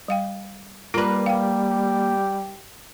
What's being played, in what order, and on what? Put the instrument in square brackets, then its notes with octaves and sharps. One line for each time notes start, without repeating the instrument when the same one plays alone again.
[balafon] G3 F5 G5
[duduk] G3 [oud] A#3 B4 [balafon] F4
[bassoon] G4 [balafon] F5 G5